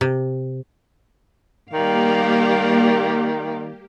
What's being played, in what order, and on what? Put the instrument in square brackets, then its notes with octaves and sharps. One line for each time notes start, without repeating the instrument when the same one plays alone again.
[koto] C3
[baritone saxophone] D#3 [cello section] G3 D5 F5 [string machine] A#3 G4